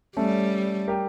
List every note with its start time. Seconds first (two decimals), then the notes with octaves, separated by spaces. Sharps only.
0.16 G3 A3 C#4
0.88 G4 A#4